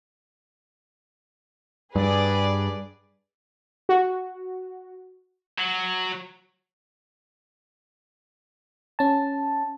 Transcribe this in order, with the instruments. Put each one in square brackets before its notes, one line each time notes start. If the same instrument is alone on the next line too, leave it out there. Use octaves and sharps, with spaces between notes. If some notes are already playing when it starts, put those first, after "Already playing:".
[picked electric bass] G2 [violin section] G#4 B4 D5
[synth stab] F#4
[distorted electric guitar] F#3
[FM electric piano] C#4 A5